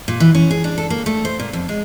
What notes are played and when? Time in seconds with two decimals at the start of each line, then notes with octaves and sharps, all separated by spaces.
0.08 A#2
0.20 E3
0.35 C#4
0.51 G#4
0.64 D4
0.78 A4
0.90 A#3
1.06 A3
1.25 C5
1.39 A#2
1.53 F2
1.69 G#3